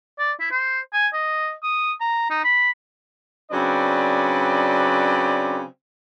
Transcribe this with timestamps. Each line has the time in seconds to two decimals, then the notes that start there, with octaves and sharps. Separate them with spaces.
0.18 D5
0.40 E4
0.51 C5
0.93 G#5
1.13 D#5
1.63 D#6
2.01 A#5
2.30 D#4
2.44 B5
3.52 C#3 F#3 C4 D4 B4 D5